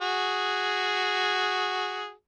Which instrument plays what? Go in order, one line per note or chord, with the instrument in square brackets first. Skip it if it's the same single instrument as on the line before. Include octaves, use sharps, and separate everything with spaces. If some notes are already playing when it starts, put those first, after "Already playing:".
[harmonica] F#4 G#4